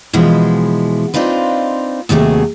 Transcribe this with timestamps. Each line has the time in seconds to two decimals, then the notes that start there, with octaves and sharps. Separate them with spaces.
0.13 B2 E3 F3 G#3 E4
1.14 C4 D4 D#4 F4 B4
2.09 D#2 C3 F#3 A3 G#4